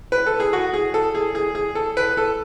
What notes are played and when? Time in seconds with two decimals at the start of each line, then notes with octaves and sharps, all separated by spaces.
0.12 B4
0.26 A4
0.40 G#4
0.53 F#4
0.74 G#4
0.94 A4
1.15 G#4
1.35 G#4
1.55 G#4
1.75 A4
1.97 B4
2.17 A4